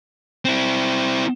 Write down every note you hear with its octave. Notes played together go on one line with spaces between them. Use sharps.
C4 E4